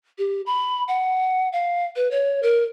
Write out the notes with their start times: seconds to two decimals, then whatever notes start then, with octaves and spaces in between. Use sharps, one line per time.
0.18 G4
0.46 B5
0.88 F#5
1.53 F5
1.96 B4
2.11 C#5
2.43 A#4